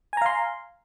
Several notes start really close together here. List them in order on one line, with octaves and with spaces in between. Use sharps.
G#5 A#5 F5 C6